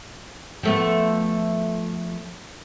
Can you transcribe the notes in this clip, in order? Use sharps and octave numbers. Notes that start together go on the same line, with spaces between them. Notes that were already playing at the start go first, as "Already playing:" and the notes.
F3 A3 B3